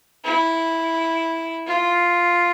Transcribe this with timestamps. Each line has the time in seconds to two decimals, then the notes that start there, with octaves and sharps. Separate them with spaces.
0.24 E4
1.67 F4